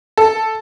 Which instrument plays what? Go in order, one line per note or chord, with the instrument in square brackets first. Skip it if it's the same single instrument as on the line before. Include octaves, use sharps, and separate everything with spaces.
[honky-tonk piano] A4